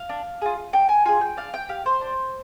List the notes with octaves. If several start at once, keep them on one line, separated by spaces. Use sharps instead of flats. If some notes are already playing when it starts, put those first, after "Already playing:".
Already playing: F5
D4
F4 G#4
D4 G5
G#5
F4 G#4 G#5
G5
D4 F5
G5
G4 F5
C5
D4